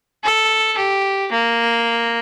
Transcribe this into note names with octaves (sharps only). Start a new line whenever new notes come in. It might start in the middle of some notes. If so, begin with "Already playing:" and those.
A4
G4
A#3